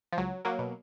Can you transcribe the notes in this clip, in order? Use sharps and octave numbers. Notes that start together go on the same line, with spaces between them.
F3
C#2 F#3
F#3 A#3
B2